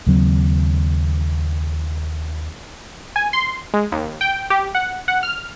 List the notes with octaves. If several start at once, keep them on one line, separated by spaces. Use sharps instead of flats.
D#2 C#3 F#3 C4
G#5
C6
G#3
D#2
G5
G4
F#5
F#5
F6